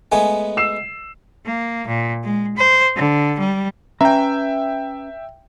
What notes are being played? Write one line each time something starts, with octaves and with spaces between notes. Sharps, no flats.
G#3 A3 B3 G#5
E6 C7 E7
A#3
A#2
G#3
C5
D3
G3
C#4 B4 E5 G5 A#5